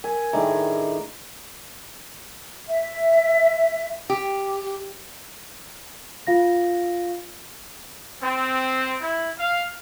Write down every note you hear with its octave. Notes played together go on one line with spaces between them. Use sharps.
A#4 G#5
A2 D#3 D4 G#4 E5 A#5
E5
G4
F4 F5 A#6
C4
E4
F5